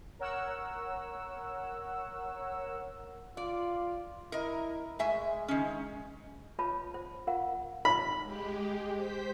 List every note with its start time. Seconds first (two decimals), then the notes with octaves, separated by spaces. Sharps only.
0.19 A#4 C#5 F#5 E6
3.37 F4 D5
4.32 E4 A#4 D#5
4.99 G#3 A3 E5 G#5
5.48 D#3 C#4
6.59 F4 B4 C#5 A5 B5
6.94 C5
7.27 F4 A#4 F5 F#5
7.85 B5
8.23 G#3 G4
8.94 C5 G6 B6